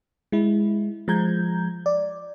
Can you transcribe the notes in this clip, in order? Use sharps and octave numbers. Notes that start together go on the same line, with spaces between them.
G#3 E4
F3 G#3 A#5 G6 G#6
D5